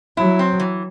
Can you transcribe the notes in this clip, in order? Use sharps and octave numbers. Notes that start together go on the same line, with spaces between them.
F#3 E4
C4
E3